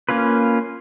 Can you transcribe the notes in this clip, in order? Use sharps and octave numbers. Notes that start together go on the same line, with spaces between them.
A#3 C#4 F4 B4